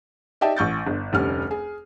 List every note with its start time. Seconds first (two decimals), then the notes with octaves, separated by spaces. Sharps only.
0.41 D#4 G4 D5 E5 G5 A5
0.56 A1 C#6 G6 A6
0.87 G1
1.13 F1 D2 G3 C#4 F6
1.51 G#4